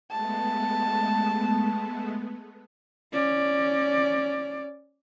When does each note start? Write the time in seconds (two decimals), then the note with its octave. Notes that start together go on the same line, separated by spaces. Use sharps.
0.11 G#3 A3 B3 A5
3.13 C#4 D5